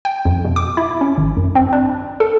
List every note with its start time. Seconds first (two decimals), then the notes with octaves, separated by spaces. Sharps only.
0.05 G5
0.25 F2
0.45 B2
0.56 D6
0.77 E4
1.01 C#4
1.18 G#1
1.37 F#2
1.55 C4
1.73 D4
2.20 A4